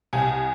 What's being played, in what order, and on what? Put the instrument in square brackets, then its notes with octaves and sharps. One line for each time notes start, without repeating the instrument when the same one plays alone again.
[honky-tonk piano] C2 G#5